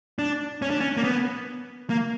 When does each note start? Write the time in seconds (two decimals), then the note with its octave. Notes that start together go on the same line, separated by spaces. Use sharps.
0.19 D4
0.62 C#4
0.70 D4
0.81 C#4
0.97 A#3
1.04 B3
1.90 A#3